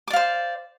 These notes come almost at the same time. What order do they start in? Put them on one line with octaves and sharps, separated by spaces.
D6 D5 F5 C5